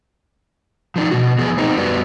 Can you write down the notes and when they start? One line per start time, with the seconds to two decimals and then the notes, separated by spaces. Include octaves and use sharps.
0.96 F3 D4 D#4
1.11 B2 D#3 F#4
1.39 F3 B3 G#4
1.57 B3 C4 D#4
1.77 F#2 F#3 G3 B3